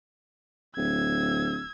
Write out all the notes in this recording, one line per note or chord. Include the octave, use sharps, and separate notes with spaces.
D1 E6 G#6